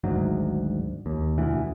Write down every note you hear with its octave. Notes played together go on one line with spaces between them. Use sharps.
G#1 D2 G#2 F#3
D#2
E1 D2 E3